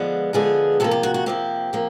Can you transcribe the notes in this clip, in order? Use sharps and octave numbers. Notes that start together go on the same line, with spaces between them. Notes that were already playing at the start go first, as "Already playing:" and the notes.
Already playing: D3 F3 G#3 B3
D3 F3 G#3 B3 G#4
C3 F3 A#3 A4
G4
F#4
F#4
C3 F3 A#3 G4
C3 F3 A#3